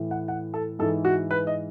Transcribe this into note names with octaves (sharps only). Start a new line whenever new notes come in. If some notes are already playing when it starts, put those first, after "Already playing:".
Already playing: A2 E3
F#5
F#5
A4
G#2 E3 A4
F#4
B4
D#5